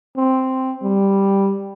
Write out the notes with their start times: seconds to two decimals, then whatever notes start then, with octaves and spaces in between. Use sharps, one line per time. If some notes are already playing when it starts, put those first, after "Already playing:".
0.17 C4
0.83 G3